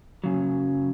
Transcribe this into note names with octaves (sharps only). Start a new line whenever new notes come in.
F#2 C#3 F#3